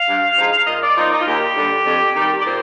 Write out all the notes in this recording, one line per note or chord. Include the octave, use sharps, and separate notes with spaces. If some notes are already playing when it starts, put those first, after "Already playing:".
Already playing: F5
G2
F3 G#3 D#4
A#2 D#5
D5
F3 A#3 D#4
D#4
F4
D#2 G4
D3 G3
F2
D#3 G3
D5
A#2 C5